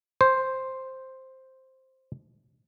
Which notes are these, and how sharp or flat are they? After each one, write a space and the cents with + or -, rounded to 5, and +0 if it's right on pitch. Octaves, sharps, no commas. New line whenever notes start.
C5 +5